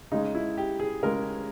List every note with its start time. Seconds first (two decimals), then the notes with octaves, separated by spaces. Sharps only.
0.12 C#3 G#3 D#4
0.35 E4
0.57 G4
0.79 G#4
1.03 C#3 G#3 A#4